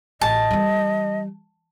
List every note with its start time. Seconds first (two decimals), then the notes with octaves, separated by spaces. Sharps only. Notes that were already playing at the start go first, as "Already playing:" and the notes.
0.21 A1 D#5 A5
0.51 E3 G3